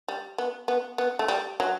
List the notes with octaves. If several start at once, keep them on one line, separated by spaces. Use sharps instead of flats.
G3
B3
B3
B3
A3
G3
F#3